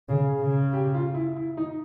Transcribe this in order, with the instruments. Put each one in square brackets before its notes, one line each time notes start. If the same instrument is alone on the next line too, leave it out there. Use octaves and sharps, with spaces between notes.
[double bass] C#3 [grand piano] G#4
[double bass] C#3
[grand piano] G4
F4
E4
E4
D#4